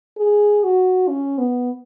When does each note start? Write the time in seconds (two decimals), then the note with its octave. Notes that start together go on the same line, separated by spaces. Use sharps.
0.18 G#4
0.64 F#4
1.08 C#4
1.38 B3